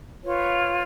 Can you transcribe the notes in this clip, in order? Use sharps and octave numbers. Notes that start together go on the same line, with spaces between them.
F4 B4 C#5